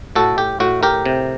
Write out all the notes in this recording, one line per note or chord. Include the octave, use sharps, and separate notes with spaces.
A2 F#4 A4
G4
A2 F#4
G4 A#4
C3